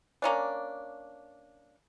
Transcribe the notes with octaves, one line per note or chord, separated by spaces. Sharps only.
A#3 C#4 D4